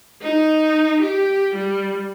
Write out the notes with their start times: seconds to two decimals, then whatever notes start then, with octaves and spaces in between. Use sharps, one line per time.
0.22 D#4
1.02 G4
1.55 G3